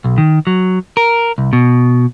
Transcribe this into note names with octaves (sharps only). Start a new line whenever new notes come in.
B1
D#3
F#3
A#4
C2
B2